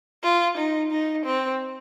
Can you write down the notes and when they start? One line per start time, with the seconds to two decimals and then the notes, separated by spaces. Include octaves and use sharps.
0.24 F4
0.58 D#4
0.91 D#4
1.25 C4